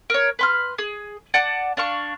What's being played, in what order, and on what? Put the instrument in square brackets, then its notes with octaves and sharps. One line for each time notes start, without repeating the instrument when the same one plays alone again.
[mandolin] A#4 C#5
B4 C6 F6
G#4
D5 F#5 A5
D4 F5 C#6